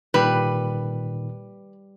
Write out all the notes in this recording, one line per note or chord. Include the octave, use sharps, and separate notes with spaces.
A#2 D#3 G3 B4